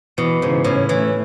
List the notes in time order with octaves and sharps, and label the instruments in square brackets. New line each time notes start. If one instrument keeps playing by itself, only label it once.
[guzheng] B2 [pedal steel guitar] E3
[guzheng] G#2 [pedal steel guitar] C#3
[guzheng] A2 [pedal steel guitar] C#4
[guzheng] E3 [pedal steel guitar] A3